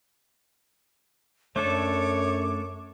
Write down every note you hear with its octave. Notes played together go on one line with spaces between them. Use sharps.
F#2 A3 D4 A4 C#5 D6